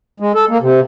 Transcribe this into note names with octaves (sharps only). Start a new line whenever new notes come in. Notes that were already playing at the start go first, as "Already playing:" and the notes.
G#3
A4
A#3
C3